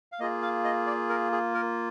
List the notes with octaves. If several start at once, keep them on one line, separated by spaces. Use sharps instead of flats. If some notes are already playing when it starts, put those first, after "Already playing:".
F5
A#3 F4 G#4 D#5
F5
D#5
D5
A#4
G#4
A#4